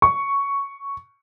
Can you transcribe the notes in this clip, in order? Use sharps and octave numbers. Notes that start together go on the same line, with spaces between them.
C#6